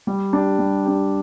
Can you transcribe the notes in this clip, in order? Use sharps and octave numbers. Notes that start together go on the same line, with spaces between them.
G3
D4 G4
G3
D4 G4